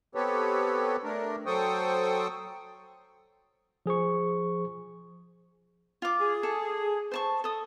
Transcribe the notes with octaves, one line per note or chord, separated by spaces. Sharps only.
B3 C4 G4 A4 B4 C#5
A3 D4 A#4
F#3 A4 C5 G5 C#6 D#6
F3 G#4 C5 C#6
F4 D6
G#4
A4
C5 A5 C#6
A4 D#6